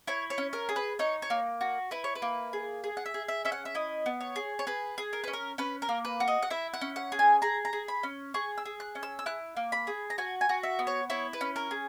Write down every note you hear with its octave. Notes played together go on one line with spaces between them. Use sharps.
E4 C#5
C#5
C#4
A#4
G#4
B4
D#4 C#5
C#5
A#3
F#4
E4 B4
C#5
B4
A#3
G#4
G#4
F#5
E5
G#4
E5
C#4 E5
F#5
E5
E4 D#5
B3
C#5
G#4
C#5
G#4 B4
G#4
A#4
C#4 B4
A#4
C#4 B4
A#4
A#3
B4
F#4
D#5
F#5
E4 E5
F#5
C#4
F#5
G#4
G#5
G#4 A#5
A#5
G#4
B5
C#4
G#4 C#6
E6
G#4
F#6
C#4
E6
E6
E4 F#6
A#3
B5
G#4
A#5
F#4 G#5
G#5
F#4
E5
B3
C#5
E4 C#5
B4
C#4
A#4
G#4